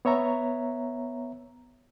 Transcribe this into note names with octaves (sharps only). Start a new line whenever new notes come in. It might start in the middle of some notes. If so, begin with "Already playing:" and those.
B3 C#5 E5 A#5